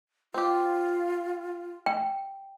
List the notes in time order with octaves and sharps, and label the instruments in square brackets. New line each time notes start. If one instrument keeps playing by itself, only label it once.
[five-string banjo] C4 G4 [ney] F4
[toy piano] G5